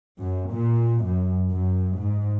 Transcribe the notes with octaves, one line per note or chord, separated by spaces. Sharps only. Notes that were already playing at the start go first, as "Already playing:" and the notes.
F#2
A#2
F#2
F#2
G#2